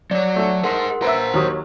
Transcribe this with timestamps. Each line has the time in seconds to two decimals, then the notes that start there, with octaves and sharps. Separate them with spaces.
0.11 F#3 C#5 D5
0.36 A3 A4
0.64 G#4 A#4 C5 F#5 C6
1.02 B4 C5 E5 A#5
1.33 D#2 F#3 D#6